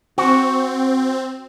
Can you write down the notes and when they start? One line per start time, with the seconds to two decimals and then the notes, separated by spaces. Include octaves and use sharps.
0.18 C4 F#4